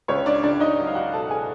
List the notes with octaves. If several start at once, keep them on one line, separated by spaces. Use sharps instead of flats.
C#2 C#4 C#5
D4 D5
C#2 D4 D5
D#4 D#5
F#3
F5
F#4 F#5
B2 A4 A5
G#4 G#5